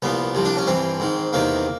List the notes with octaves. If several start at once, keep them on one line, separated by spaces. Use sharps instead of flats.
C2 A#2 F3 B3
C2 C3 F3
D4
C#4
G2 E3 C4
G#2 D#3
E2 C3 D#3 A#3